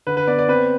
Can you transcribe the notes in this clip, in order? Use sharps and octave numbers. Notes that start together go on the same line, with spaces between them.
D3 B4
B4
B3 D5
D5
C4 B4